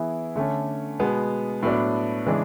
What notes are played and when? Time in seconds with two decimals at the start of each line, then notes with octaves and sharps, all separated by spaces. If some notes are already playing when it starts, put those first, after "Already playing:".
Already playing: E3 B3 E4 G#4
0.36 D3 A3 C#4
1.00 B2 G#3 B3
1.63 A2 F#3 B3 D4
2.26 C#3 E3 G#3 D4